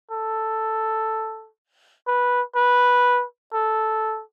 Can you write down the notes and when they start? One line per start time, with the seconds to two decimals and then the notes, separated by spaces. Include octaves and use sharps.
0.11 A4
2.07 B4
2.56 B4
3.53 A4